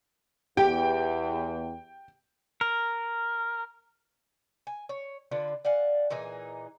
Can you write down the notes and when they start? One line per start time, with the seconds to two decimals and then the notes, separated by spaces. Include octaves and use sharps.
0.57 E2 G4 G5
2.61 A#4
4.67 G#5
4.89 C#5
5.31 D3 D4 F4 B4
5.65 D5 F5 F#5 G#5
6.10 A#2 E3 D#4 G#4